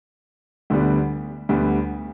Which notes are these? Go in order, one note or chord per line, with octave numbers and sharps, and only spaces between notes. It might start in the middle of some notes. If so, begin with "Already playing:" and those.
D2 D3 G3 B3
D2 D3 G3 B3